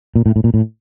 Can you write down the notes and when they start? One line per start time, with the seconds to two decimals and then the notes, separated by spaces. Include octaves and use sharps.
0.15 A#2
0.26 A2
0.36 A2
0.44 A#2
0.54 A2